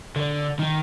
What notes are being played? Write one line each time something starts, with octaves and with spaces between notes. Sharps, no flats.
D3
D#3